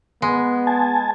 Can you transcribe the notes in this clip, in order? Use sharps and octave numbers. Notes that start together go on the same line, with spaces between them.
G#3 B3
G#5 A5